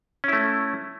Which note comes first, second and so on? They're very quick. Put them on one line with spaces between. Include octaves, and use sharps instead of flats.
C#4 E4 A3